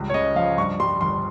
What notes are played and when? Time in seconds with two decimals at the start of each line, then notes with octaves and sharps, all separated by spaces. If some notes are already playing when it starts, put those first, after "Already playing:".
Already playing: C#2 G3
0.10 C#5
0.14 C#3 D#5
0.36 F3 F5
0.58 G2 C#6
0.80 G3 C6
1.01 G1 C6